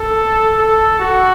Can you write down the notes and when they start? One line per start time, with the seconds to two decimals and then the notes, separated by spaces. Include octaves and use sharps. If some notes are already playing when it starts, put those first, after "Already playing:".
Already playing: A4
0.58 A4
0.99 F#4